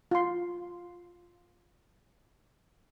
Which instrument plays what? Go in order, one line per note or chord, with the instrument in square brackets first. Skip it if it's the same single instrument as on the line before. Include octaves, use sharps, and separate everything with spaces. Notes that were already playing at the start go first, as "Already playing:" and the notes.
[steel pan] F4 C6